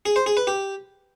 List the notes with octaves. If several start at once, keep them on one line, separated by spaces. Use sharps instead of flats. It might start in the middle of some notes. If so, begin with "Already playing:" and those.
G#4
C5
G#4
B4
G4